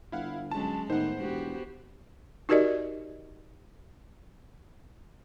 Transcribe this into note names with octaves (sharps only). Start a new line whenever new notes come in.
G1 E4 F5 F#5
F#3 G#3 C#4 A5
A2 D#3 B3 C5 F#5
E1 B3 F#4 G4
D#4 F#4 G4 A#4 D5 D#5